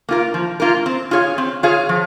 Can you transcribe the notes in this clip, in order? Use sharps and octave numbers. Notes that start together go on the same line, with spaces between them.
A#3 F4 A#4
F3
A#3 F4 A#4
C4
F4 G#4 C#5 F5
C4
F4 G#4 C#5 F5
F3